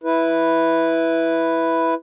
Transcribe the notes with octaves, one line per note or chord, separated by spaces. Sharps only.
E4 B4